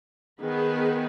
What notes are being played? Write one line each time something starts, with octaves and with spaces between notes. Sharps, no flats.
D#3 B3 G#4 B4